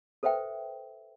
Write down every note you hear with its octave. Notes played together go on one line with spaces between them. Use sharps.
A4 B4 C5 E5 G5